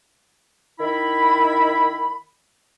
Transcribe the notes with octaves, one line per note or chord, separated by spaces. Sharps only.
D#3 E4 B5